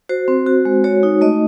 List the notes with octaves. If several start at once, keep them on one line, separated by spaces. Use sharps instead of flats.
F#4 C5
C4
F#4
G#3
F#4 C#5
D#4
A3 D#5